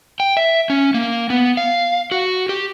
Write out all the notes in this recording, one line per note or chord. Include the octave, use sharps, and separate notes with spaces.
G5
E5
C#4
A#3
B3
F5
F#4
G4